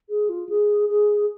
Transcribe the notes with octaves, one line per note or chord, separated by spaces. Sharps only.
G#4
F4
G#4
G#4